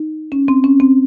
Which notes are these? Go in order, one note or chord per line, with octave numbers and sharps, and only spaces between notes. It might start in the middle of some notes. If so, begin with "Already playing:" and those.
Already playing: D#4
C#4
C4
C#4
C4